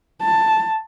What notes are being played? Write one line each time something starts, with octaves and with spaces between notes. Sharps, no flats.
A5